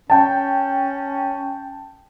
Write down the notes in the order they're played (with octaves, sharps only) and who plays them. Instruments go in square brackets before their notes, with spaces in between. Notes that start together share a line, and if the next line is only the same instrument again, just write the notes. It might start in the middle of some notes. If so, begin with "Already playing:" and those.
[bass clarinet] C#4 [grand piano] G5 A5